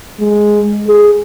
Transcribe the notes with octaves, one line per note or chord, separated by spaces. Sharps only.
G#3
G#4